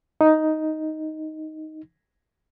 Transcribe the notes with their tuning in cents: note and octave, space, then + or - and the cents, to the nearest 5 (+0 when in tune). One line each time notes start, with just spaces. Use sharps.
D#4 +5